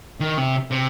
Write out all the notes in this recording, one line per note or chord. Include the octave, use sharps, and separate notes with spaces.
D#3
C3
C3